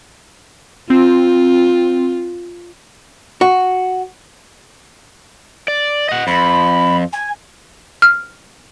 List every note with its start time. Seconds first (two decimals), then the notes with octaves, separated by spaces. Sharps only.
0.90 C4 F4
3.41 F#4
5.68 D5
6.09 D#5 F#5
6.27 F2 B5
7.12 G#5
8.02 F6